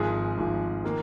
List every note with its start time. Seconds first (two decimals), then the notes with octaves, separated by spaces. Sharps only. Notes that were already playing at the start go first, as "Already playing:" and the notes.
Already playing: G#1 G#2 F3 G#4
0.38 G#1 G#2 F3
0.84 D#3 A#3